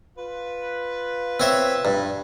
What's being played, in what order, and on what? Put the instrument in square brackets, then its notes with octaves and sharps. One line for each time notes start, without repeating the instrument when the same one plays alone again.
[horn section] F4 B4
[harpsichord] C4 C#5 E5
G2